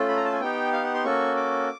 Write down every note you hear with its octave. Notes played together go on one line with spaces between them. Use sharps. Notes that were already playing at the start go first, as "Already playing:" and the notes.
Already playing: A3 C#4 F4 A4
B5
A#5
A5
G#5
B3 D#4 G4 G5
F5
F#5
C6
A#3 C#4 F#4 A4 C#6
D6